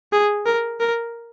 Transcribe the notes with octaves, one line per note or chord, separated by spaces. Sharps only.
G#4
A#4
A#4